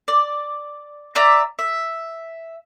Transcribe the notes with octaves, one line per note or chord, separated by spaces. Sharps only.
D5
D5 E5 A#5 D6
E5